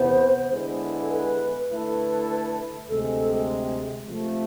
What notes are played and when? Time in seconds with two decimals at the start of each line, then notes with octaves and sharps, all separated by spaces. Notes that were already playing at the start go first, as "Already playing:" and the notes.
Already playing: E2 C3 E3 B3 C5
0.51 D3 G#3 B3 E4 G#4
1.02 A4
1.11 B4
1.70 D3 A3 E4 A4 B4
2.89 D2 C3 G#3 A4
4.09 C3 F3 A3